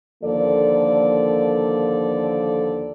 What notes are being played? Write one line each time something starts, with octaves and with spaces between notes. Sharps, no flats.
D#2 D3 F3 A#3 A4 D5